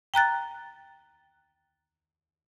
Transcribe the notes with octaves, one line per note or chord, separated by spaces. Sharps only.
G5 A#5 F#6 A6